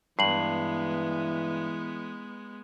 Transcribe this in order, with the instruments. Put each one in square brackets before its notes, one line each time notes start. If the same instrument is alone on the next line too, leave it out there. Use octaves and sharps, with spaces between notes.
[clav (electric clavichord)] G2 [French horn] E3 [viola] G#3 B3 [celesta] C7 F#7